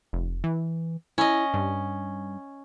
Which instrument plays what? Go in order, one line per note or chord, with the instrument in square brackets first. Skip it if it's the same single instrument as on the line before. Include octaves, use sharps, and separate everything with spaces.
[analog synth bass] F1
E3
[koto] C#4 D#5 [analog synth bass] E4
[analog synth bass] G2